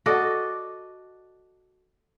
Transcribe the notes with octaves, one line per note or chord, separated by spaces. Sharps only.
F#4 A4 D5 D#5